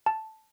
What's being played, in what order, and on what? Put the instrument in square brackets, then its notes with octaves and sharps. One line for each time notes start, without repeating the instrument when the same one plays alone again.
[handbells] A5